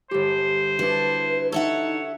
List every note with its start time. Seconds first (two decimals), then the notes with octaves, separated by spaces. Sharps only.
0.11 G1 G4 C5
0.79 D4 E4 F#4 B4
1.52 D#4 A4 C#5 E5 F#5